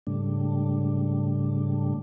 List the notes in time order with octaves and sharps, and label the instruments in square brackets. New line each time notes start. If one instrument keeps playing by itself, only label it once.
[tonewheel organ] G#2 C#3 G3 A3 D4